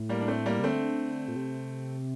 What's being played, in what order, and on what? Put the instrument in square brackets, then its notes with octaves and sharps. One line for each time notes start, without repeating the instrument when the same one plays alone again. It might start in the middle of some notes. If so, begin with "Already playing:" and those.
Already playing: [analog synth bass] A2
[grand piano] G3 A#3
D4
A3 C4
G3 A#3
[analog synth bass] C3
[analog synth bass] D3 [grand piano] A3 C4
[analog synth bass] A#2
C3